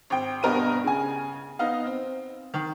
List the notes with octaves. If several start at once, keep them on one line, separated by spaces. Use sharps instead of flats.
G#1 G5
G2 B2 B3 A#4 D#5 D#7
C#3 G#5
B3 D#4 D#5 F5
C4
D#3